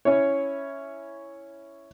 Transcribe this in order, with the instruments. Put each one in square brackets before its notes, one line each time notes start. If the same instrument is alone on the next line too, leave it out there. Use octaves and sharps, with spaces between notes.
[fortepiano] C#4 E4 C#5